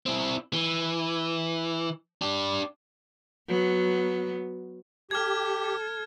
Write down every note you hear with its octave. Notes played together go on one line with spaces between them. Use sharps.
C4 E4
E3
D4 G4
F#3 B3
G4 A4 F6 G#6